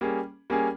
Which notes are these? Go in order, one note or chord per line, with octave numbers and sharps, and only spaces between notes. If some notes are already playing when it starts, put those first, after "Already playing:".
G3 A#3 C#4 G#4
G3 A#3 C#4 G#4